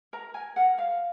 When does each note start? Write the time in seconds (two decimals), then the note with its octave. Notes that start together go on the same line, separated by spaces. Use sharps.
0.13 A#4 A#5
0.34 A#4 G#5
0.56 A#4 F#5
0.78 A#4 F5